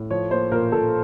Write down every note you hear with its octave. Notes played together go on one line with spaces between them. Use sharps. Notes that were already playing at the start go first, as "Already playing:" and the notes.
Already playing: A2
F3 C#5
A#3 C5
A#2 A#4
A#2 A4